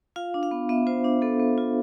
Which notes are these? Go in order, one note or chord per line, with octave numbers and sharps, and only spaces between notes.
F4 F5
D4
F5
B3
B3 E5
F4 C5
D4
B3 A4
B3
F4